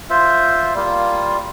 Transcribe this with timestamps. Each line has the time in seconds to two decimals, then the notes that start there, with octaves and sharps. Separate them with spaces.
0.10 F4 C5 E5
0.74 G3 A#3 F4